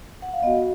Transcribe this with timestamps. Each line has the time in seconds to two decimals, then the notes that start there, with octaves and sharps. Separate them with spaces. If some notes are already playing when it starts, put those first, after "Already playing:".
0.22 F#5
0.33 F5
0.43 B3 F#4 D#5